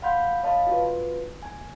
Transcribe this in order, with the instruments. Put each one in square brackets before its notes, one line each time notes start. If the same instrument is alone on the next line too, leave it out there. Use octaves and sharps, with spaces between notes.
[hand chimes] F5 F#5 B5 C6 G6
C#5 D#5 F5 A5 B5
F4 F#4 B4
G#5